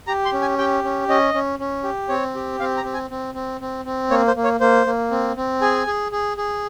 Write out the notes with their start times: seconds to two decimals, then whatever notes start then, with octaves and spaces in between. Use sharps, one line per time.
0.07 G4 A#5
0.25 C6
0.33 C#4
0.42 G#5
0.58 G4 G5
0.84 C#4
1.08 C#4 D#5
1.34 C#4
1.59 C#4
1.84 G4
2.09 C4 C#5
2.35 G4
2.60 C4 F5
2.77 A#5
2.84 C4
2.94 G#5
3.10 C4
3.35 C4
3.61 C4
3.85 C4
4.10 A#3 C#5
4.28 C5
4.36 A#3
4.44 C#5
4.60 A#3 C5
4.87 A#3
5.11 C4
5.36 C4
5.61 G#4 G#5
5.87 G#4
6.12 G#4
6.37 G#4